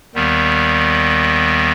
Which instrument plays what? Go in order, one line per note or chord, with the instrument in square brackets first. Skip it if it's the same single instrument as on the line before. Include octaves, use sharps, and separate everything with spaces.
[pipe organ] D#2 D#3 G3 B3